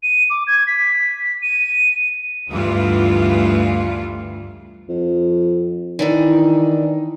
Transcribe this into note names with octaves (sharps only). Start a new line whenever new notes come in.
D#7
D6
G#6
B6
D#7
D2 G2 E3 F4
F2
D#3 E3 D4 D#4